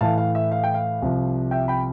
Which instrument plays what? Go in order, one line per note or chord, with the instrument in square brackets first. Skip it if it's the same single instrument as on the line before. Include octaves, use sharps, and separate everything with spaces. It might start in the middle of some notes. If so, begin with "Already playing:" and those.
[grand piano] A2 E3 A3 F5 A5
F5
E5
F5
G5
F5
C2 C3 F3
E5 G5
G5 B5